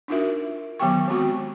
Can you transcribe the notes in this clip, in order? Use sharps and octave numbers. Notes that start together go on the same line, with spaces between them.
D4 D#4 F4 F#4 A#4 E5
D#3 F#3 B3 G4 G5 C#6
D#3 G#3 B3 C4 F#4 C#6